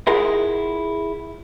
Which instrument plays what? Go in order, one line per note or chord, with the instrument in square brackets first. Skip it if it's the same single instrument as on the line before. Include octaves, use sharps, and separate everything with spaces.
[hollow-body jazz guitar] E4 F4 G#4 A#4 F#5